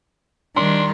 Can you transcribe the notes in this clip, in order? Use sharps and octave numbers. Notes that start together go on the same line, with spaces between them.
D#3 G3 D4 C6